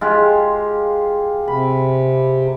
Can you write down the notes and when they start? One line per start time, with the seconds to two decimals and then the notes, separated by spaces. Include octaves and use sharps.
0.01 G#3 F4 G4
1.48 C3 B5